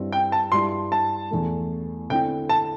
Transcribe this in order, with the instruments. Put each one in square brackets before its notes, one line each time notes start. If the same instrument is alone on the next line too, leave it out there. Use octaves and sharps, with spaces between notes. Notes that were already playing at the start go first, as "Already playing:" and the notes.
Already playing: [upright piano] G2 G3 C4 E4
[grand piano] G5
A5
[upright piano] G2 G3 E4 [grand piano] C6
[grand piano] A5
[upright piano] E2 E3 A3
[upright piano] D3 C4 E4 [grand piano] G5
[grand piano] A5